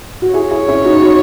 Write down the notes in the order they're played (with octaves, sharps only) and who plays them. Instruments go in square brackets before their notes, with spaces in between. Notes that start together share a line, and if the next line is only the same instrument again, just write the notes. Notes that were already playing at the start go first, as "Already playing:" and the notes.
[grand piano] F#4
[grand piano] E4 G#4 [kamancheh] C#5
[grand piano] E4 G#4
C#4 E4
D#4 F#4
D#4 F#4